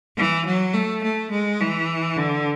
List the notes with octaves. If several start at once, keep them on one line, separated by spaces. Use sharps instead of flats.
E3
F#3
A3
A3
G#3
E3
D3